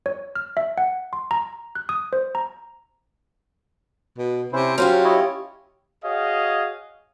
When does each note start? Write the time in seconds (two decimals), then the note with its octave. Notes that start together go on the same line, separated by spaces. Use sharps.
0.06 C#5
0.35 F6
0.57 E5
0.78 F#5
1.13 C6
1.31 A#5
1.75 F#6
1.89 D#6
2.13 C5
2.35 A#5
4.18 B2
4.53 C3 C#4 E4 C5
4.78 F#3 C#4 F4 G4 C5
5.04 E4 C#5 D#5
6.04 F#4 G#4 C#5 D#5 F5